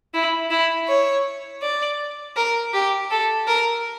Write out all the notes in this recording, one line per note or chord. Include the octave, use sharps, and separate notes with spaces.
E4
E4
C#5
D5
A#4
G4
A4
A#4